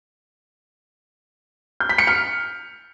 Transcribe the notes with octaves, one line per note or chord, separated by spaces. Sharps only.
G6
B6
C#7
F6